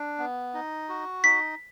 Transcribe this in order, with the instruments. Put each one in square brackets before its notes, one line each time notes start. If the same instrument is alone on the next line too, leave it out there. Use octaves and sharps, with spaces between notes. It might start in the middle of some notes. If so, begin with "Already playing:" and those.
Already playing: [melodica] D4
B3
D#4
F#4
[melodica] D#4 [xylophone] B6